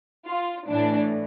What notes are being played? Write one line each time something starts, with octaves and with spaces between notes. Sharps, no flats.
F4
A2 E3 D4